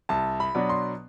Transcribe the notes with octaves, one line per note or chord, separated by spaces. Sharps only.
C2 A5
B5
B2 F#3 B3 D4
C6